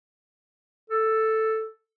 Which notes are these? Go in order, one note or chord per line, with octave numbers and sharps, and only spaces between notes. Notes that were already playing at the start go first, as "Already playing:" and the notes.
A4